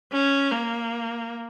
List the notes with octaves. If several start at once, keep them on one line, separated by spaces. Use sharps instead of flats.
C#4
A#3